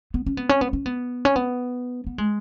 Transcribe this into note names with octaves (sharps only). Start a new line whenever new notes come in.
B3
C#4
B3
C#4
B3
C#4
B3
C#4
B3
B3
G#3